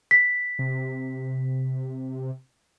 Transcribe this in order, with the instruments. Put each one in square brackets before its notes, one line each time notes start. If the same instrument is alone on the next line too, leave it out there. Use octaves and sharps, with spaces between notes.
[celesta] B6
[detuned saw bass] C3